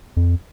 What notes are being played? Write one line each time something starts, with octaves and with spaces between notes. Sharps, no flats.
F2